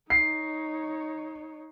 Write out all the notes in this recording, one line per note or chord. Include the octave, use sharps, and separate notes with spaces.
D#4 C#5 C7